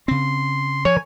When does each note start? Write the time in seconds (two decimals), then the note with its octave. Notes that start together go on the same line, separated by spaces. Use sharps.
0.08 C#3 C4 C6
0.85 F3 C#5 G#5